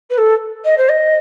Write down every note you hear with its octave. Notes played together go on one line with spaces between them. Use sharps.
B4
A4
D#5
C5
D#5